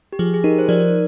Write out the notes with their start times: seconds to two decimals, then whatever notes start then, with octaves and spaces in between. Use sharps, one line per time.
0.13 G4
0.19 F3 G#4
0.34 G#4
0.44 D#4 G4 A#4
0.59 C5
0.68 F3 A#4 D5